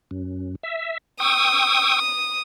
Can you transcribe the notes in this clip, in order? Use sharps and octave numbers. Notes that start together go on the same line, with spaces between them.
F#2
E5
G5 C#6 D#6 E6